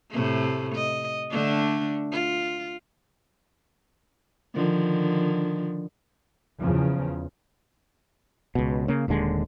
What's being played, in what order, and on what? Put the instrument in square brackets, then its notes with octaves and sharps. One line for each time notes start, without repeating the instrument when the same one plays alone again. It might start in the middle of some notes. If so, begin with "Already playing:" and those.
[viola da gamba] A2 C3 A3
D#5
D3 A3 D4
F4
D3 D#3 F3
[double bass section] E2 C#3 F3
[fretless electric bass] C#2 B2
C#3 A#3
D#1 D#2 D3 G#3